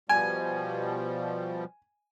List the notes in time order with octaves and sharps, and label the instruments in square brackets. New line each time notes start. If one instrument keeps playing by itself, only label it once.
[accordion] B2 F3 G3 [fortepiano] G#5